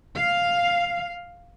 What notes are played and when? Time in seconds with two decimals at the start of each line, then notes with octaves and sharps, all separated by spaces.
0.15 F5